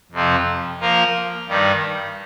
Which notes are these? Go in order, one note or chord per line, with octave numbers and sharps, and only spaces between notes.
F2 C3 F3 C4
F3 A#3 F4 A#4
G2 D#3 G3